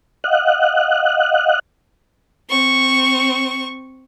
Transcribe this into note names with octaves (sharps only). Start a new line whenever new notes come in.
D#5 F5 F#5 F#6
C4 C#6